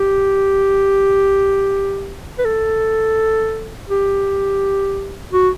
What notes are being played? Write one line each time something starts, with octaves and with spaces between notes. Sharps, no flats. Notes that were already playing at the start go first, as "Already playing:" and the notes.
Already playing: G4
B4
A4
G4
F#4